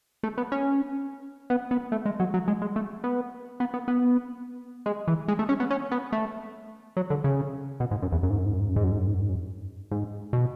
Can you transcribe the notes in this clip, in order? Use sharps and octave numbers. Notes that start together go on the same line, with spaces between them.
A3
B3
C#4
B3
B3
A3
G#3
F#3
F#3
G#3
G#3
A3
B3
B3
B3
B3
G#3
E3
G#3
A3
C#4
B3
C#4
B3
A3
F#3
D3
C#3
B2
G#2
F#2
E2
F#2
G#2
F#2
G#2
F#2
G#2
F#2
G#2
F#2
G#2
F#2
G#2
F#2
G#2
F#2
G#2
B2